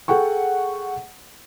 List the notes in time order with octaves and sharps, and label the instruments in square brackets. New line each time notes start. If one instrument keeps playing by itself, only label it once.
[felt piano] G#4 A4 F#5 G5 C#6